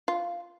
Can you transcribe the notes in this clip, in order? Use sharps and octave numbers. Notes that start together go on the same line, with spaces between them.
F4